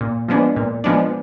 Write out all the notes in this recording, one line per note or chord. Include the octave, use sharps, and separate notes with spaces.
A#2
F3 G#3 B3 D4
A#2
F3 G#3 B3 D4